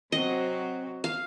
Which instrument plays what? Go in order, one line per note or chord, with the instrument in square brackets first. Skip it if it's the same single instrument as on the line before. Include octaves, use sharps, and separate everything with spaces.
[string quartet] C3 F#3 C4 F#4 [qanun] D#5
[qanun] F5